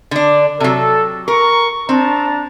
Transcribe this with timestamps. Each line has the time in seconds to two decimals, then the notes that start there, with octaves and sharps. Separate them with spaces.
0.11 D3 D4
0.60 C3 F#3 A4
1.28 A#4 A#5 C#6
1.89 C4 D4 A5 A#5